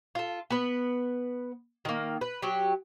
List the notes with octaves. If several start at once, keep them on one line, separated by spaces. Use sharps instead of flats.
F4 A4
B3 B4
D#3 A#3
B4
F#3 G4